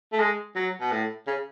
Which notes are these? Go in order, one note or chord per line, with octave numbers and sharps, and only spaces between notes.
A3
G#3
F#3
B2
A2
C#3